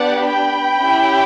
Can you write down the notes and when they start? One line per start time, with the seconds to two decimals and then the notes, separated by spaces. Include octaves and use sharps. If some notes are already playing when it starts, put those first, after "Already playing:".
Already playing: B3 D4 G4 D5 F#5
0.24 G5 B5
0.79 C#4 E4 G4